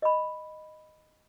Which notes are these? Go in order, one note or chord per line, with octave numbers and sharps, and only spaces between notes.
D#5 B5